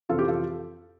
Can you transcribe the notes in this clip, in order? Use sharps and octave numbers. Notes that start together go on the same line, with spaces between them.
F2 C3 E3 F4 A4
G4
F4 A4